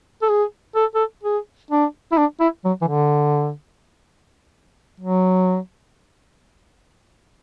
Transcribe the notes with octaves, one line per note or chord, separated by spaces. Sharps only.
A4
G#4
A4
A4
G#4
D4
E4
D4
E4
F#3
E3
D3
F#3